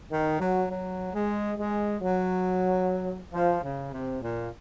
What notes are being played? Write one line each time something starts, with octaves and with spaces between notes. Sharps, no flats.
D#3
F#3
F#3
G#3
G#3
F#3
F3
C#3
C3
A#2